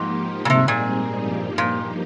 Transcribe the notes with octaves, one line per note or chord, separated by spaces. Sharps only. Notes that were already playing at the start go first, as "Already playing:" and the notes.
Already playing: G#2 F3 A#3 D#4 G4
A#2
G#2 C3 G3 C4 D#4 G#4
A#2
G2 F3 A#3 D#4 G4
A#2